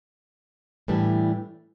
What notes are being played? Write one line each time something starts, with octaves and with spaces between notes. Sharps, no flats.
A2 E3 G3 D4